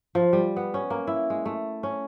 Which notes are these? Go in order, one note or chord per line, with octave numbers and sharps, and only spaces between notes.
F3
G3
B3
C#4
A#3
E4
G#3
A3
C#4